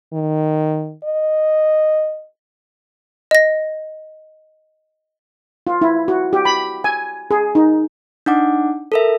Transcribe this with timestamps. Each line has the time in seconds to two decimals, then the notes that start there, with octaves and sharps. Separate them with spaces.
0.13 D#3
1.04 D#5
3.31 D#5 A#6
5.67 F4
5.81 E4
6.08 F#4
6.33 G4
6.45 B5
6.84 G#5
7.31 G#4
7.55 D#4
8.26 D4 D#4 F#5 D6
8.92 A4 A#4 E5